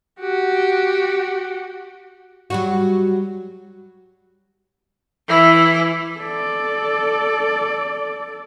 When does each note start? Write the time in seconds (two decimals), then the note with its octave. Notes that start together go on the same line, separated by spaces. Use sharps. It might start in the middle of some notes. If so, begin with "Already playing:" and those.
0.20 F#4 G4
2.50 F#3 G3 F#4
5.28 E3 E4
6.20 A4 D5